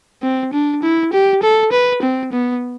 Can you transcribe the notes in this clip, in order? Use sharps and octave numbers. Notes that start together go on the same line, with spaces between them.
C4
D4
E4
G4
A4
B4
C4
B3